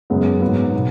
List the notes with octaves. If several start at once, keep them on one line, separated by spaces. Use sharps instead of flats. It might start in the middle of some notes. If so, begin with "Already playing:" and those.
F#2 C#3 G#3 B3
G#2 F#3 B3
B2